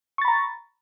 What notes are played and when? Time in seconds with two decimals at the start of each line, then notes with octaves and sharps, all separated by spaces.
0.18 C#6
0.21 A6
0.25 B5
0.28 A#5